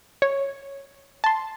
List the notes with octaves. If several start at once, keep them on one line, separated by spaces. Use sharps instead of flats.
C#5
A5 C6